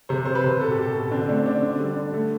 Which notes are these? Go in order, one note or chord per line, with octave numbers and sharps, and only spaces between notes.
C3 C5
C3 C5
B4
C3
B2 A4
G4
B2 A4
B2
D3 C4
A3 D4
D3 D4
D3
G3
D3
A3